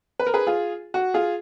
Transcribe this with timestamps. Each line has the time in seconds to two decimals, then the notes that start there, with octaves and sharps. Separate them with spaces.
0.20 B4
0.27 A#4
0.34 G#4 B4
0.47 F4 G#4
0.94 F#4
1.14 F4 G#4